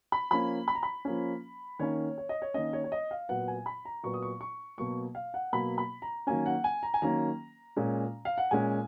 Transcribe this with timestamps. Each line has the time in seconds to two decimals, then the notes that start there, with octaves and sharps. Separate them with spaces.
0.12 B5
0.31 F3 A#3 C#4 B5
0.68 B5
0.75 A#5
0.83 B5
1.05 F3 A#3 C#4
1.79 D#3 A#3 C#4 C#5
2.18 C#5
2.29 D#5
2.42 C#5
2.54 D#3 A#3 C#4 D#5
2.73 C#5
2.84 C#5
2.92 D#5
3.11 F5
3.29 A#2 F#3 B3 F#5
3.48 G#5
3.66 B5
3.85 A#5
4.03 A#2 F#3 B3 C#6
4.14 D#6
4.23 C#6
4.41 C#6
4.78 B2 F#3 A#3 C#6
5.15 F5
5.34 F#5
5.53 B2 F#3 A#3 B5
5.78 B5
6.02 A#5
6.27 D#3 F#3 A#3 C#4 G#5
6.46 F#5
6.64 G#5
6.83 A#5
6.94 G#5
7.02 D#3 F#3 A#3 C#4 A#5
7.76 A#2 G#3 C#4
8.25 F5
8.38 F#5
8.51 A#2 G#3 C#4 G#5